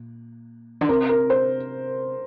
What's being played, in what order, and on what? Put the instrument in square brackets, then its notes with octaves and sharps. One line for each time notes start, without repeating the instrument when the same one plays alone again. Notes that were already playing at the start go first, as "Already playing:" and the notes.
Already playing: [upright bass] A#2
D3
[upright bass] C3 [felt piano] A#4
[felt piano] A#4
C5